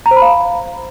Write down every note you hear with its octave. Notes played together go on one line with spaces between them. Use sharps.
A#5
C5
B5
F5